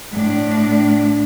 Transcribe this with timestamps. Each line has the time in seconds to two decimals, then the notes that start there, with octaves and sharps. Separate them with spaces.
0.12 A2 D4